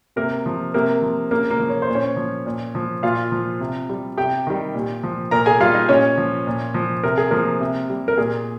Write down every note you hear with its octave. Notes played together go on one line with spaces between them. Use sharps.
C3 A#3 A#4
F3
C3 A#3 A#4
F3
C#3 A#3 A#4
A#3 A#4
F3
C#5
C5
A#2
C#4 C#5
F3
A#2
F3
A#2 F4 F5
F3
C3
G3
C3 G4 G5
D#3 G3
A#2
F3
A#2 A#4 A#5
G#4 G#5
G3 F4 F5
D#4 D#5
A#2 C#4 C#5
F3
A#2
F3
C3 A#4
G#4
F3 A#3 A#4
C3
G3
A#4
A#2 G#4